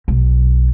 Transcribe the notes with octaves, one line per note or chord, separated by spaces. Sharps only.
B1